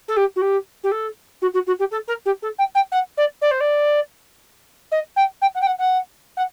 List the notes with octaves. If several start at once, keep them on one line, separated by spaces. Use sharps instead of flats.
A4
G4
F#4
G4
G4
A4
F#4
F#4
F#4
G4
A4
A#4
G4
A4
G5
G5
F#5
D5
D5
C5
D5
D#5
G5
G5
F#5
G5
F#5
F#5
F#5